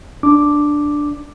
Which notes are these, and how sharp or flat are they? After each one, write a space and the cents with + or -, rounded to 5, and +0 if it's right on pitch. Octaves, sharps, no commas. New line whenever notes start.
D4 +0 D6 +0